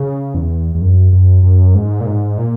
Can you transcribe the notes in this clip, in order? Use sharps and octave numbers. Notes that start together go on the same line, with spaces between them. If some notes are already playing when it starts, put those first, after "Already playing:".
Already playing: C#3
E2
E2
F#2
F#2
F#2
G#2
A#2
G#2
A#2